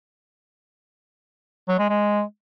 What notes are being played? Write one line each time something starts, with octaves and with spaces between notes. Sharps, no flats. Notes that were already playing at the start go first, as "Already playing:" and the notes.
F#3
G#3
G#3